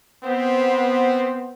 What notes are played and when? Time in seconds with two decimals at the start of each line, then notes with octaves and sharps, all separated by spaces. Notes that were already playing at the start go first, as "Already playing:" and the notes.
0.23 B3 C4 C5